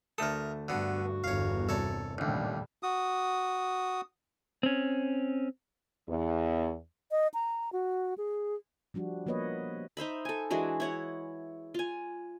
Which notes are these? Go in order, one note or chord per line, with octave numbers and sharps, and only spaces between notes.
D2 A3 A4 A#4 D#6
G2 D3 B3 F#4
G1 E2 G2 C#5 F5
C2 A4 C#5 D5
A1 D#2 A#2 D3 G3
F#4 D#6
C4 C#4
E2
D#5
A#5
F#4
G#4
F3 G3 D4 F#4
F3 A#3 B3 B4 C#5 D#5
D#4 C5 E5 B5
A4 G#5
E3 G#3 D4 F#4
E4 C#5 F#5
F4 G#5